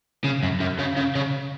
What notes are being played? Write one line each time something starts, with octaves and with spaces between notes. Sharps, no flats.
C#3
F#2
F#2
C#3
C#3
C#3